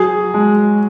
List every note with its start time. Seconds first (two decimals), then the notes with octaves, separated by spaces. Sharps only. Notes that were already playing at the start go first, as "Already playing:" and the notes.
Already playing: F#3 G#4
0.34 G#3